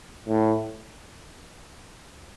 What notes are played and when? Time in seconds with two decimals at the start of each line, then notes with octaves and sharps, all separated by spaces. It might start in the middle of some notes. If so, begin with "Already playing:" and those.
0.29 A2